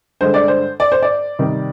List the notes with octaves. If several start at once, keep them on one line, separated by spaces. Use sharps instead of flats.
G2 D3 G#3 C5
D5
C5
D5
C5
D5
C3 D#3 G3